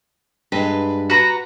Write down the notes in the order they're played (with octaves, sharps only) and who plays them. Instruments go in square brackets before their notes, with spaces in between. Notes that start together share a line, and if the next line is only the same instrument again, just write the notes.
[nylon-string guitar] G2 G#3 [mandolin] B4
[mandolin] F#4 B4 A#5